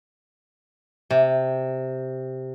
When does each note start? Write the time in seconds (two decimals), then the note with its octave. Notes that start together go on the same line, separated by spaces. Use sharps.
1.10 C3